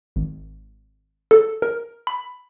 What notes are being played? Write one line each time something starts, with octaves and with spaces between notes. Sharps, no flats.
G#1
A4
A#4
B5